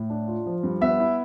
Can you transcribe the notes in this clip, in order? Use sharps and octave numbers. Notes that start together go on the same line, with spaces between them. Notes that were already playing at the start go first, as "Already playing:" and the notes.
Already playing: A2
D4
F4
F3
G2
B3 E5
E4